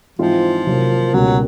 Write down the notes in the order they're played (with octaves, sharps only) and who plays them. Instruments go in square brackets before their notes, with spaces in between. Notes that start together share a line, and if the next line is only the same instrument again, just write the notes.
[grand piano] G#2 E3 G#3 C4 F4 [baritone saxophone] F3
[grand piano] C3 D#3 F#3 A#3
[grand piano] C#2 B2 G3 A#3 C#4 [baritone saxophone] F#3